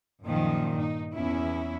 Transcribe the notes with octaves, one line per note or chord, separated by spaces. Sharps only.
F#2 A#2 D#3 F3
G2 D#4
E2 C#4 E4